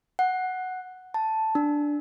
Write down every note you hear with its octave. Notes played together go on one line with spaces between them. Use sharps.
F#5
A5
D4